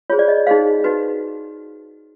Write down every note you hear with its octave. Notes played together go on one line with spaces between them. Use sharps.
F4 G#4 C5 C#5
D5
D#5
D#4 G#4 C5 F5
D#4 F#4 B4